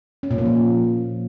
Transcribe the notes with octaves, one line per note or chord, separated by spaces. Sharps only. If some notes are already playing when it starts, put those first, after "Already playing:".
C#4
A#2
A#3
F3